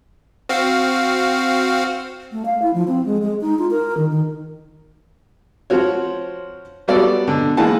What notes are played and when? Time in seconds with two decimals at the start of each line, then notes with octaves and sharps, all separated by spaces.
0.49 C4 F#4 F5
2.32 A3
2.45 F5
2.62 E4
2.74 F3
2.88 C4
3.05 G#3
3.22 G#3
3.41 D#4
3.59 F4
3.71 A#4
3.97 D#3
4.10 D#3
5.70 F3 C4 F#4 C#5
6.88 F#3 G3 B3 F#4 A4 D5
7.27 B2 D3
7.57 E3 G#3 A#3 F#5 A5